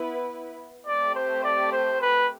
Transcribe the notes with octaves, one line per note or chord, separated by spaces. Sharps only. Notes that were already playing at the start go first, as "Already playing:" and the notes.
Already playing: B3 E4 B4
A3 C4 G4 D5
C5
D5
C5
B4